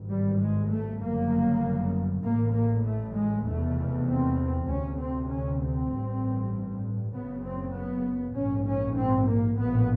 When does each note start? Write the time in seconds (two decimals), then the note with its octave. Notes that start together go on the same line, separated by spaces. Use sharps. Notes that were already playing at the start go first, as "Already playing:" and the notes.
Already playing: G#1 G2
0.10 G3
0.40 G#3
0.70 A3
1.01 G1 F#2 C#3 A#3
2.24 A1 A2 A#3
2.54 A#3
2.84 A3
3.15 G#3
3.46 F1 E2 B2 A3
4.07 C4
4.68 D2 C3 C#4
4.99 C4
5.30 C#4
5.61 C4
5.91 A1 G2
7.13 F#1 F#2 C#3 B3
7.43 C4
7.74 B3
8.35 A#1 G#2 C#4
8.66 C#4
8.97 C4
9.27 A#3
9.58 A#1 A2 B3